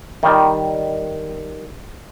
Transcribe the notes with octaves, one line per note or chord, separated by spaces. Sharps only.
D#3 G3